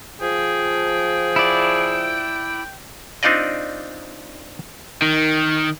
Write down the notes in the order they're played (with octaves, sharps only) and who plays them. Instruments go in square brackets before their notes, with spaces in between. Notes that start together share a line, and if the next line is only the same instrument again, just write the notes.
[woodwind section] F3 [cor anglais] G#4 [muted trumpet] G5
[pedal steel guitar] E4 D5
[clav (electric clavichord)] C4 D4 D#4 F4 D5 D#5
[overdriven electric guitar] D#3